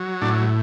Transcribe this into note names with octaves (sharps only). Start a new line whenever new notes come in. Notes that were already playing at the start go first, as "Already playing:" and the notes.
Already playing: F#3
A2 D4